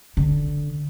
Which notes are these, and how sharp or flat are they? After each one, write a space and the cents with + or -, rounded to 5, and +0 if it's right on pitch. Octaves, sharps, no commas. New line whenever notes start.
D3 +0